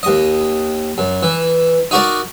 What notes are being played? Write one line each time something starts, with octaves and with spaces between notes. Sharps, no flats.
D#2 D#5
F#2
E3
D#4 F#4 A#4 D5